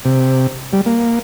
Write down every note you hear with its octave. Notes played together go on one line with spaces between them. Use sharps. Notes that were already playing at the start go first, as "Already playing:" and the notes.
C3
G3
A#3